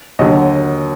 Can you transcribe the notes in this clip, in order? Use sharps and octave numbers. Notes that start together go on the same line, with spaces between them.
D#2 D3 F#3 D#5